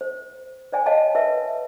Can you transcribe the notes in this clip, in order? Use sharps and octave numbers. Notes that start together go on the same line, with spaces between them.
C5
C5 D5 G5 G#5
C#5 D#5 F5 G5 A5
A#4 B4 E5